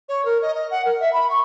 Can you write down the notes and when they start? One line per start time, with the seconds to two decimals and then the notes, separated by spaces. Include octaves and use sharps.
0.09 C#5
0.25 A#4
0.42 D#5
0.55 D#5
0.71 F#5
0.85 A#4
1.00 E5
1.13 B5
1.30 C#6